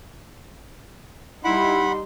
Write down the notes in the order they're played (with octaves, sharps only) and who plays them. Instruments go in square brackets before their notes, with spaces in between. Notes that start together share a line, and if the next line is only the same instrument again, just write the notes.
[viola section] G3 D#4 [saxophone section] E4 [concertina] F#5 B5 [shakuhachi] C6